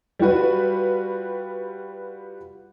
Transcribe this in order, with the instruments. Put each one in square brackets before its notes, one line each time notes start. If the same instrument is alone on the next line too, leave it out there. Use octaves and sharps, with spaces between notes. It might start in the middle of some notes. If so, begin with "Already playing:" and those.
[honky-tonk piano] G3 F4 F#4 B4